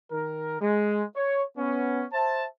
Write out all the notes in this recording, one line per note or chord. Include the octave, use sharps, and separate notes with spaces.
D#3 A#4
G#3
C#5
B3 C#4
C5 E5 A5